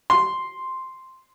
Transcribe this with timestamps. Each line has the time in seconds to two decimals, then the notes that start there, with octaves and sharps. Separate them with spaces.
0.10 C6